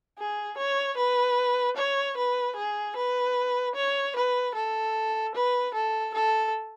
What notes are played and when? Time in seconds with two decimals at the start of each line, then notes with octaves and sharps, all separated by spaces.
0.18 G#4
0.58 C#5
0.97 B4
1.77 C#5
2.17 B4
2.56 G#4
2.96 B4
3.75 C#5
4.16 B4
4.55 A4
5.35 B4
5.74 A4
6.14 A4